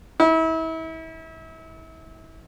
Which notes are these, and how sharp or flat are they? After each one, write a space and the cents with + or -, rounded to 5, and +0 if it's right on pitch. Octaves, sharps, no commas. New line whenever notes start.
E4 -35